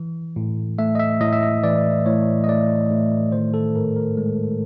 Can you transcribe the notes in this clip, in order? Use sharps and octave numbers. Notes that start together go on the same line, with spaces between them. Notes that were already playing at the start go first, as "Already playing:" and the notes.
Already playing: E3
A2
A3 E5
D#5
E5
A2 D#5
E5
D#5
E3 D5
A2 C#5
D#5
A3 D5
A2
D#3 C5
A4
G#2 A#4
A#4
G#3